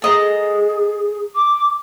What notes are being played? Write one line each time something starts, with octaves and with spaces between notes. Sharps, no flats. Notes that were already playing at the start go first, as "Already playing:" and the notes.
G#4 A4 D#5 A#5
D6